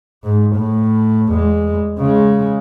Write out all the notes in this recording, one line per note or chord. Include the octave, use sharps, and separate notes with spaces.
G#2
A2
E2 G#3
C#3 G#3